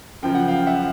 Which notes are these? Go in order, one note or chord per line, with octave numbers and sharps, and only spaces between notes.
F#2 C#3 F3 G5
F#5
F5 G5
E5 F#5